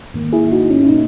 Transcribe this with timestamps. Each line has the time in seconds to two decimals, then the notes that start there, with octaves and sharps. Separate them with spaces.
0.14 G#2 D#3 A#3
0.33 E4 G#4
0.51 D#4 F#4
0.70 C#4
0.83 E4
0.89 B2 A#3 D#4